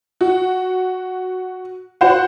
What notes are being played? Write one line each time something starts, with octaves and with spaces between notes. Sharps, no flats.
F#4
F#4 C5 F#5